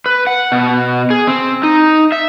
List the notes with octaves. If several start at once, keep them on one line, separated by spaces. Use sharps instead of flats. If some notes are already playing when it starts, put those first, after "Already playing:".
B4
F#5
B2
G#4
C4
D#4
E5